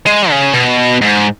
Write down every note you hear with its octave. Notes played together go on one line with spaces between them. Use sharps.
G#3
C#3
B2
G#2